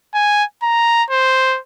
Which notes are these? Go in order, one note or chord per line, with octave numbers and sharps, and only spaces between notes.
G#5
A#5
C5